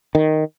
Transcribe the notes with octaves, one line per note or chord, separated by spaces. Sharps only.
D#3